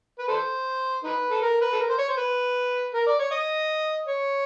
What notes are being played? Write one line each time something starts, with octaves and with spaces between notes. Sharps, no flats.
B4
A4 C5
D#4 B4
A4
A#4
B4
A4
A#4
C5
C#5
C5
B4
A#4
D5
C#5
D#5
C#5